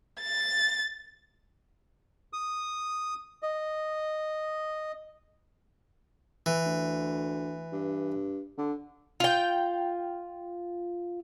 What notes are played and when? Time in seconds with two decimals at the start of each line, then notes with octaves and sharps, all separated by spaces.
0.20 A6
2.33 D#6
3.43 D#5
6.46 E3
6.65 D2
7.72 G2
8.58 D3
9.20 F4 G5